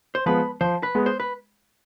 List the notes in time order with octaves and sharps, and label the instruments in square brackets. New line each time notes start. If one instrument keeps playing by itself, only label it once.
[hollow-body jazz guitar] C5
[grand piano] F3 G#3 B3 [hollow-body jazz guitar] B4
[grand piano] F3 [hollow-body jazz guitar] C5
[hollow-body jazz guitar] B4
[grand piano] G#3 B3
[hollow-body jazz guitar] C5
B4